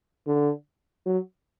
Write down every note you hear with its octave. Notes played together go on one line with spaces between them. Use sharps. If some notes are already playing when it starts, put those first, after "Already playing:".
D3
F#3